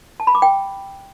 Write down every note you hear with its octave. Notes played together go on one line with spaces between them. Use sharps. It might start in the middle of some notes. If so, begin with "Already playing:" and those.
A5
B5
D6
G5